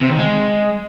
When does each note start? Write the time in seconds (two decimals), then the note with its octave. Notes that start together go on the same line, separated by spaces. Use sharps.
0.01 C3
0.10 D#3
0.19 G#3